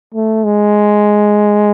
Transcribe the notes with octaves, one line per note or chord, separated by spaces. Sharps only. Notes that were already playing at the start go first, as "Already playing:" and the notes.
A3
G#3